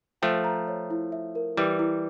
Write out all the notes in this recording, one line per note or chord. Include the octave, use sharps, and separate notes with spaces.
F3 A3 G5
A#5
C#5
E4
E5
A#4
E3 G3 E4
E4